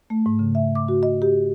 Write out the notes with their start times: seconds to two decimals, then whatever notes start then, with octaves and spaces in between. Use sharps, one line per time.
0.10 A3
0.26 G#2
0.39 C#3
0.55 E5
0.75 D6
0.88 F#4
1.03 D#5
1.22 G4